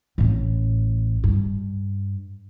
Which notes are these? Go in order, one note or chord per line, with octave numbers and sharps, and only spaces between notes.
A1 A2
G2